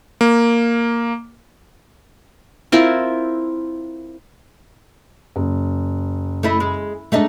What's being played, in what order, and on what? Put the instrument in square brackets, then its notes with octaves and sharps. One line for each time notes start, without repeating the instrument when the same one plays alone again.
[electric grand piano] A#3
[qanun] C4 E4 F4 A#4
[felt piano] F#1
[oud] A3 E4 D#5
G#3
[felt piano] G#3 D4 [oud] A3 D#4 D#5